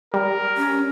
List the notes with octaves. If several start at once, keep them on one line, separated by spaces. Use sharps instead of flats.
G3 A#4
C#4